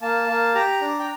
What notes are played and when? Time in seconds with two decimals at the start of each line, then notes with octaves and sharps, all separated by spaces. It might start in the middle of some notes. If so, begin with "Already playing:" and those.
0.02 A#3 A5
0.28 A#3
0.55 G4 A#5
0.81 D4
1.00 G5